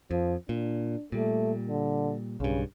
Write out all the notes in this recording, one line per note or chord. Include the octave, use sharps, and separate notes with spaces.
F2 F3
A#2 D4
A#2 G3 A3
D3
B1 G2 C#3